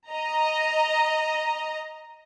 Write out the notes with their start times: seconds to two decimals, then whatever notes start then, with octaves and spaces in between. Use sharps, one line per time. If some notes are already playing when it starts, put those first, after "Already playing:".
0.10 D#5 A#5